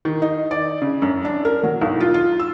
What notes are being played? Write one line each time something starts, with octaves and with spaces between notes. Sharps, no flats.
D#3
D#4
D5
C#3
F#2
D4
A#4
F#3
B1
F4
F4
E6